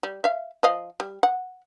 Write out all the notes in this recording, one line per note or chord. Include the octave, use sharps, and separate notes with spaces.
G3
E5 F5
F3 D#5 F5
G3
F#5